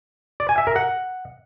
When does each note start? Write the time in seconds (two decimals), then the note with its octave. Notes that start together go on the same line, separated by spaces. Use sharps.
0.40 D5
0.49 G#5
0.58 E5
0.67 A#4
0.76 F#5